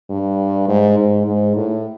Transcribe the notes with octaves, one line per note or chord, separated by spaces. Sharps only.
G2
G#2
G#2
G#2
A2